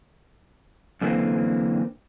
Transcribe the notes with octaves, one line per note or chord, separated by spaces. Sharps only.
F#2 D3 E3 A3 A#3 C4